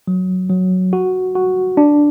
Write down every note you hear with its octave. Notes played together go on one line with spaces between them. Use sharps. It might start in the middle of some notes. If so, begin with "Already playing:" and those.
F#3
F#3
F#4
F#4
D4